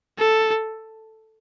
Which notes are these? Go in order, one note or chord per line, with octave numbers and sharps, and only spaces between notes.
A4